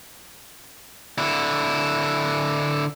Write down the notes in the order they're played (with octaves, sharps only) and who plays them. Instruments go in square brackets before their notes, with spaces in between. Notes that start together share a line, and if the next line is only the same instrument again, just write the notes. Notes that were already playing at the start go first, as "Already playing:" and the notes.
[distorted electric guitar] D3 E4